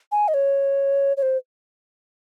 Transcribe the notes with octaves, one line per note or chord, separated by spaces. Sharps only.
G#5
D#5
C#5
C#5
C5